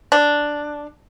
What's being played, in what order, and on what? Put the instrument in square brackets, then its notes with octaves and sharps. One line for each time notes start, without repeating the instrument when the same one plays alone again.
[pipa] D4